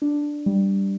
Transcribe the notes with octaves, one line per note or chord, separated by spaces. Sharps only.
D4
G3